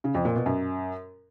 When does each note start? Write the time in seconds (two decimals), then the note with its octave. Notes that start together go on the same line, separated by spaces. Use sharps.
0.04 C#3
0.15 F2
0.25 A#2
0.35 B2
0.46 F#2